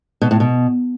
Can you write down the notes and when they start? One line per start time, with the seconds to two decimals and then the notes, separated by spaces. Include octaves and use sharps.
0.22 B2
0.31 A2
0.40 B2